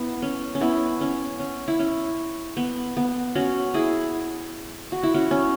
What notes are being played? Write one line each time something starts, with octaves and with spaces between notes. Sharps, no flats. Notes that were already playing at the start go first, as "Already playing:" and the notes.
Already playing: B3 E4
C#4
C#4
B3 E4
C#4
C#4
E4
C#4
B3
B3
C#4 F#4
E4 G#4
F#4
E4
C#4 F#4
C#4